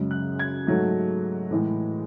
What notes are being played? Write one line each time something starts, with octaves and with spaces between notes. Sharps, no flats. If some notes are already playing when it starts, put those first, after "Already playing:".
Already playing: F#2 C#3 G#3
F#6
G#6
G#2 F#3 A3
A2 E3 G#3